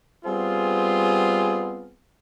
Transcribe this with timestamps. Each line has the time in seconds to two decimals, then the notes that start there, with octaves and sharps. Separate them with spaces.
0.25 G3 B3 C4 F4 G#4